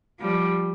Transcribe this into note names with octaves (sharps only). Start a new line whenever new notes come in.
F3 G3